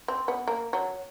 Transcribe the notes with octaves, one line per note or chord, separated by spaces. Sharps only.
C4
B3
A#3
F#3